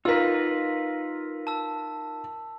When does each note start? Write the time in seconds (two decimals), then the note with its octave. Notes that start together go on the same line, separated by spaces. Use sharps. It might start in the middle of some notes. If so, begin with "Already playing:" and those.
0.05 D#4 F4 A#4 B4 E6 B6
1.47 A5 E6